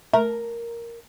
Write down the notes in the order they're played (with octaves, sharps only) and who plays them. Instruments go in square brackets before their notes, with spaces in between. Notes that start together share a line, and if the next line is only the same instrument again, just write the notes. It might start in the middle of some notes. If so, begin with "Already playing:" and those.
[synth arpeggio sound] A3 [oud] A#4